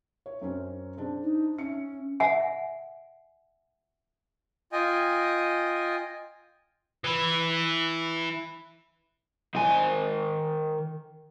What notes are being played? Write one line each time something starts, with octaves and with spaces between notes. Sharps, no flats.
C#5
F#2 C4 C#4
C4 D4 G#4
D#4
C#4 E5 C#7
E5 F#5 G#5
F4 D#5 G5 G#5
E3 E4
D#3 G#5